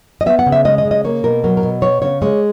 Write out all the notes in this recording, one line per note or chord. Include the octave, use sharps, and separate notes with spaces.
D#5
B3 E5
F#5
C#3
E5
G#3 D#5
D#5
C#3
D#5
A#3 C#5
B2 A#4
F#3 A#4
A#4
B2
B3 C#5
C#3 C#5
G#3 C#5